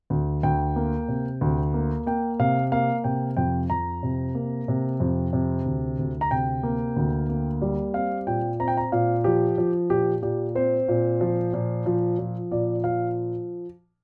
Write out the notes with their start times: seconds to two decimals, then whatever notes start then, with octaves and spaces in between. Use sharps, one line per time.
0.10 D2
0.43 D2 G5
0.76 A#3
1.08 C3
1.41 D2
1.74 A#3
2.06 A#3 G5
2.39 C3 F5
2.72 A#3 F5
3.04 C3 G5
3.37 F2 G5
3.70 F2 A#5
4.03 C3
4.35 A#3
4.68 C3
5.00 F2
5.33 C3
5.65 D2
5.99 D2
6.21 A#5
6.31 C3 G5
6.63 A#3
6.96 D2
7.29 A#3
7.62 G3
7.94 C4 F5
8.27 A#2 G5
8.60 C4 A#5
8.68 G5
8.77 A#5
8.92 A#2 F5
9.24 F3 G4
9.58 F3
9.90 A#2 G4
10.22 A#2 G4
10.55 C4 C5
10.88 A#2
11.21 F3
11.53 A#2
11.86 F3
12.19 F3
12.51 A#2 D5
12.84 F3 F5